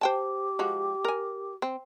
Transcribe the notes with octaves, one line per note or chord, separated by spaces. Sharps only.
G4 C5 G5 A5
F3 G#3 F#4
A#4 G#5
C4